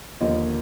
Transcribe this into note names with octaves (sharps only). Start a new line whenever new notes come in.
D#2 D3 F3 A#3 D#5